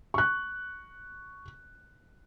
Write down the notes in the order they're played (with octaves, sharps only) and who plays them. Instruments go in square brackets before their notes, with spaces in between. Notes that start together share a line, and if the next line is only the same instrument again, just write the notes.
[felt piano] C#6 F#6